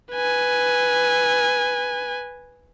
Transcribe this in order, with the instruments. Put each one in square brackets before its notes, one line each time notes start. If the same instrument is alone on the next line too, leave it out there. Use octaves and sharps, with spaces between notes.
[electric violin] B4 G#5